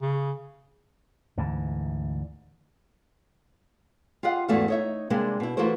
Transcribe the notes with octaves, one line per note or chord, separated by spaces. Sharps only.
C#3
D2 G#2 E3
F4 G4 D#5 F5 F#5
E2 G#2 A3 B3 F#4 F5
D#4 C#5 E5
C3 G3 G#3 A#3 D4 A#4
B2 E4
E3 A3 F4 F#4 A#4 C5